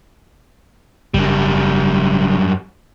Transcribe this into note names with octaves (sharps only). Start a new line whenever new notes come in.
F#1 F#2 G3